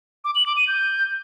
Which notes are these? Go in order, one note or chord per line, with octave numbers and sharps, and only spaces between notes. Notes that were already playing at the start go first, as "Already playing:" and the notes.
D6
F#7
D6
D#7
G6